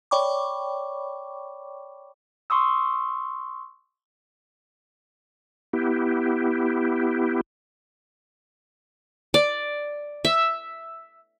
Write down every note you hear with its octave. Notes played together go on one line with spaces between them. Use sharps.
C#5 D5 G5 B5 C#6 D6
C6 C#6 D#6 E6
B3 E4 G4
D5
E5